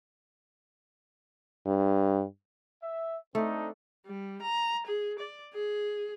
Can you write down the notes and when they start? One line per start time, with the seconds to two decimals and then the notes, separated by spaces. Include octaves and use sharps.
1.67 G2
2.83 E5
3.35 A3 C4 D4 D#4
4.06 G3
4.42 A#5
4.87 G#4
5.19 D5
5.54 G#4